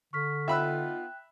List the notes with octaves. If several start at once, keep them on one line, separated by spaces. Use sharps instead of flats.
D3 C#6 F6 B6
B3 D#4 F4 E5 G5 B5 E6 F#6